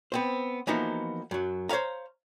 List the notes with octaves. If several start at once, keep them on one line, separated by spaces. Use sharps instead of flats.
B3 C4 C5
E3 F3 A#3 B3 D#4 F#4
F#2 F#3
C5 C#5 E5 F5 A#5